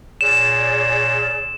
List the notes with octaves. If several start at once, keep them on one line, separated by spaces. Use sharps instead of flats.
A#2 G#4 C#5 D5 E7